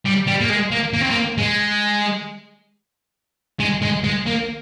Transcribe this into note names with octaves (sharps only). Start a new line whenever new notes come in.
G3
G3
A#3
G#3
A#3
A#3
C4
A#3
G#3
G#3
G#3
G#3
A#3